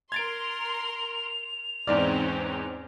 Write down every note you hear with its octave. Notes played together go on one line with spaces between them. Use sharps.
A#4 C6 G#6 A6 D7 F7
E2 G#2 C4 C#4 D#4 D5 F6